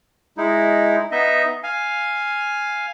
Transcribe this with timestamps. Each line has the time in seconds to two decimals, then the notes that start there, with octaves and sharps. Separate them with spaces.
0.37 G#3 D#4 E4
1.12 B3 D#4 D#5 E5
1.63 F5 G#5